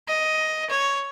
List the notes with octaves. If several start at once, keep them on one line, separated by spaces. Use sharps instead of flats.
D#5
C#5